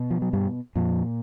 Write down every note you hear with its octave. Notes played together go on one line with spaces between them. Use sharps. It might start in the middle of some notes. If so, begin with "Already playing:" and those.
Already playing: B2
F3
F#3
G2 G3
F2 A#2 F3